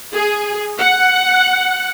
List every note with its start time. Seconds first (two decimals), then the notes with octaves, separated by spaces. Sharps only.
0.13 G#4
0.79 F#5